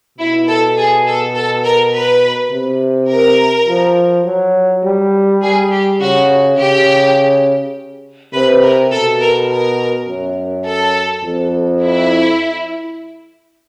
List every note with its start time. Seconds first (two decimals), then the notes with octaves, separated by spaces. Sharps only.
0.18 B2 E4
0.48 A4
0.77 G#4
1.06 A4
1.35 A4
1.64 A#4
1.93 B4
2.51 C3
3.09 A#4
3.67 F3
4.25 F#3
4.84 G3
5.42 G3 G#4
5.71 G4
6.00 C#3 F#4
6.58 C#3 G4
8.33 C3 B4
8.63 A#4
8.91 B2 A4
9.20 A#4
9.49 A#4
10.07 F#2
10.66 A4
11.24 F2
11.83 E4